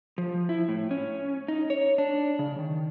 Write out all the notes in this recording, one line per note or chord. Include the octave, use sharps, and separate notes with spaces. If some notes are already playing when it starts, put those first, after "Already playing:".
F3
E4
A2
C#4
D#4
C#5
D4
C#3
D#3